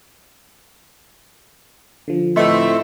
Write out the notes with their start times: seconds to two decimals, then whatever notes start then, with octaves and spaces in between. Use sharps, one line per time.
2.08 D3 F3
2.36 A2 E3 A3 C4 E4 D#5 E6